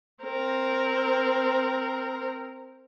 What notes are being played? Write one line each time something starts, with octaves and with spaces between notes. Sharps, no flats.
C4 A#4